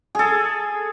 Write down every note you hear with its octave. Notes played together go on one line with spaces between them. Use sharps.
G#4 A4